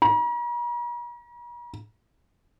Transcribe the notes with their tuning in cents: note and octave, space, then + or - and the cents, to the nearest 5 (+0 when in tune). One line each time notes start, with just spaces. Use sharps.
A#5 +45